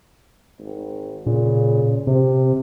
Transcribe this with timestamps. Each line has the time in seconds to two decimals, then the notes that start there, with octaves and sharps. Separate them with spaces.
0.59 G#1
1.26 A#2 C#3
2.07 C3 C4